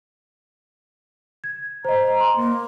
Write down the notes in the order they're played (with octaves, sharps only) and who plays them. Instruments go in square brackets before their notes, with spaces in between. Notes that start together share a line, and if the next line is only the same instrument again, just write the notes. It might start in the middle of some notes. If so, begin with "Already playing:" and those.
[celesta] G#6
[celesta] C5 D#5 [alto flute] A#5
[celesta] C6
[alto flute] A#3